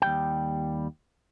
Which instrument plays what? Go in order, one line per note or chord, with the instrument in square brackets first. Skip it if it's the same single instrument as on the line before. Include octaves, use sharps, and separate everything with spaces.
[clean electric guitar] D#2 G3 G5